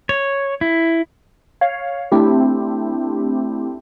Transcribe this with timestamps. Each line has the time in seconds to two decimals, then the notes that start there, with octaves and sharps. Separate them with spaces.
0.09 C#5
0.61 E4
1.61 C#5 F5
2.12 A3 C4 D4 E4 G4